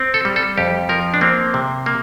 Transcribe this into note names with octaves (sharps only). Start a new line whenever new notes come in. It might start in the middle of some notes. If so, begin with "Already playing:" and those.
Already playing: C4
A4
G3
A4
F2 G4
F3 A#4
D4
A#3 C4
C3
A#3